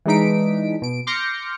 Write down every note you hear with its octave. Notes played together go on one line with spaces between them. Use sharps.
E3 G#3 D4 D#4 B6 D7
B2 D7
C6 D6 F6 G6 A#6 C#7